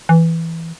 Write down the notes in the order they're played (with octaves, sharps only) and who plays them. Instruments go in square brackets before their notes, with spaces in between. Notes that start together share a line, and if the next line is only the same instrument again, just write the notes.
[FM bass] E3